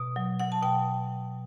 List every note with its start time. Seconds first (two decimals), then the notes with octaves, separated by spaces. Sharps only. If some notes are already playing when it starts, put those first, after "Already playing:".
Already playing: B2
0.16 F#3
0.40 F#3 F#5
0.52 A5
0.63 B2 G5